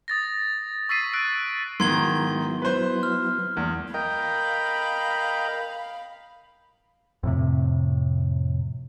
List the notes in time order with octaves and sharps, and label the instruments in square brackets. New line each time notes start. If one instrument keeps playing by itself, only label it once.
[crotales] D#6 A6 A#6
C#6 E6 A6 B6 C7 D#7
E6 F#6 D7
[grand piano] G#2 D#3 [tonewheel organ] F#3 B3 E4 [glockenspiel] C6 G#6 G7
[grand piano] B4 C5
[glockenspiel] F6
[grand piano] E2 [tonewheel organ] G#3 A#3
[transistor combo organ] A#4 D#5 G5 [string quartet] F5 B5
[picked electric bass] F2 A2 C3